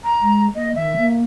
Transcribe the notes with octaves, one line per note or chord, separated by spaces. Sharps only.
A#5
G#3
A#3 D#5
D#3 E5
A#3